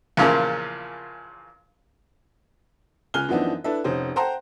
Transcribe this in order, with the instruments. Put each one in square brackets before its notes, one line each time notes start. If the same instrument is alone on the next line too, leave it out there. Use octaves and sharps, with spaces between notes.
[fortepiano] E2 A#2 C#3 F3 A#3
[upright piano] C#2 G#5 F6 F#6 G7
F#2 E3 F3 B3 D4 D#4
D4 E4 A4 B4 E5
F1 C#4 D#4 C5
C5 F#5 G5 A5 A#5 C6